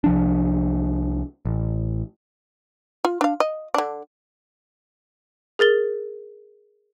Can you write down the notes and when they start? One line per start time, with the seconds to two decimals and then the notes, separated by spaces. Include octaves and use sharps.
0.04 C2 F3 D4
1.45 A1
3.05 F4
3.21 D4 F5
3.40 D#5
3.74 D3 D4
5.59 G#4 A#4 A6 G7